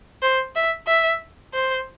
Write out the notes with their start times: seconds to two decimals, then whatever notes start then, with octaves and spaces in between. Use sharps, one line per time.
0.22 C5
0.55 E5
0.87 E5
1.54 C5